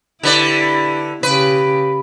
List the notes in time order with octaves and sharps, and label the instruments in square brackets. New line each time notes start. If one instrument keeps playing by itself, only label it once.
[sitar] D3 B4 D5 [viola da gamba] E4 G4
[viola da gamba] C#3 G4 [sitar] B4